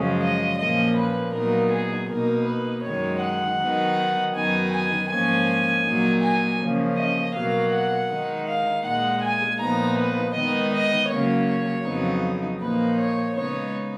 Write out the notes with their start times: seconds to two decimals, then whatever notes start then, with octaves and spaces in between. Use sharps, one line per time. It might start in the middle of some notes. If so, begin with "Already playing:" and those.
Already playing: F#2 C#3 F3 G#3 C#4
0.21 D#5
0.58 A#2 F3 A#3 C#4 D#5
0.96 B4
1.33 A#2 F#3 B3 D#4 A#4
1.72 G#4
2.09 B2 A#3 D#4 A#4
2.46 B4
2.84 F#2 D#3 G#3 D#4 C#5
3.22 F#5
3.59 D#3 F#3 B3 D#4
4.34 F#2 D#3 F#3 B3 D#4 G#5
4.72 G#5
5.09 G#2 F3 A#3 C#4 G#5
5.84 A#2 F#3 A#3 D#4
6.21 G#5
6.60 C#3 F3 A#3 C#4
6.97 D#5
7.34 B2 F#3 A#3 F5
7.73 F#5
8.10 D#3 G#3 D#4
8.47 F5
8.84 A#2 G#3 D#4 F#5
9.22 G#5
9.60 A#2 F3 B3 D#4 A#5
9.98 B4
10.35 D#3 G#3 B3 D#4 D#5
10.73 D#5
11.09 C#3 F#3 A#3 C#4 C#5
11.85 F2 C#3 F#3 B3 D#4
12.60 A#2 F3 A#3 D#4 B4
12.98 C#5
13.35 C#3 G#3 B3 D#4 C#5